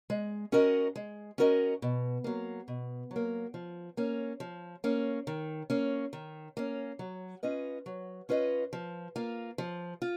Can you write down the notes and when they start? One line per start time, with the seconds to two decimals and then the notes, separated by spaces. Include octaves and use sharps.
0.10 G#3
0.52 C#4 F#4 A#4 D#5
0.96 G#3
1.38 C#4 F#4 A#4 D#5
1.82 B2
2.24 F#3 A#3
2.68 B2
3.11 F#3
3.16 A#3
3.54 F3
3.97 A#3 C#4
4.40 F3
4.84 A#3 C#4
5.27 D#3
5.70 A#3 C#4
6.13 D#3
6.57 A#3 C#4
6.99 F#3
7.43 C#4 F4 B4 D#5
7.86 F#3
8.29 C#4 F4 B4 D#5
8.73 F3
9.16 A#3 F4
9.58 F3
10.02 F4